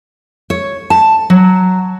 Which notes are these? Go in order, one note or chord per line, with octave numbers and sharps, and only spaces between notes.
C#5
A5
F#3